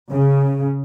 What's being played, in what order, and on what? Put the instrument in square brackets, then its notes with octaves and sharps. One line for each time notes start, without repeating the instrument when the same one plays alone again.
[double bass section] C#3